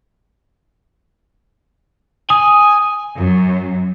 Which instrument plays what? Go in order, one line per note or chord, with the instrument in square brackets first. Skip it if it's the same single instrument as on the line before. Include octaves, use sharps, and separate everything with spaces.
[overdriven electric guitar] G#5 [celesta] D#6
[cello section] F#2